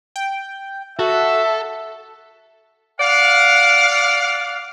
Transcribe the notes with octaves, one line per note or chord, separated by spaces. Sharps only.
G5
F#4 A4 E5
D5 F5 F#5